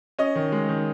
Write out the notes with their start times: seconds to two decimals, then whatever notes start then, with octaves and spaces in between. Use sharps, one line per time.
0.19 C#4 D#5
0.35 D#3
0.52 G#3
0.69 D#3